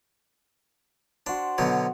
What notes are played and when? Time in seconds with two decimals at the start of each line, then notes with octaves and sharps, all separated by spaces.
1.27 D4 F#4 C5 C6
1.58 B2 D3 F#3